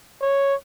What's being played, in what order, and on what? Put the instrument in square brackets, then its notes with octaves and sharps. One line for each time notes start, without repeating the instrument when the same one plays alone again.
[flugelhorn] C#5